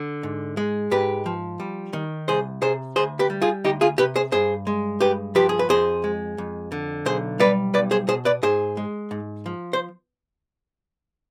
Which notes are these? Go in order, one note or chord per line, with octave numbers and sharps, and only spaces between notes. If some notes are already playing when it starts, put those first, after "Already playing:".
Already playing: D3
G#2
G#3
G#2 G4 B4
F3
G3
D#3
C2 G#4 C5
C3 G#4 C5
D2 G#4 C5
G4 B4
G3
F4 G#4
D2 D#4 G4
F4 G#4
C3 G4 B4
G#4 C5
G2 G#4 C5
G#3
G2 G4 B4
F3 G4 B4
G#4
B4
F2 G#4 C5
G#3
F2
D3
B1 G#4 C5
G3 B4 D5
B1 B4 D5
G#4 C5
B2 G#4 C5
B4 D5
G#2 G#4 C5
G#3
G#2
F3
C5